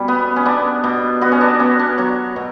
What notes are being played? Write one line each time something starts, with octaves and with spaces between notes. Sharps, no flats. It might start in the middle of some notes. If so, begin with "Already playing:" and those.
Already playing: B2 G3 C#4
B3
C#4
B3 D4
B2
B3 F#4
C#4
D4
B3 C#4
D4
F#3 C#5
B2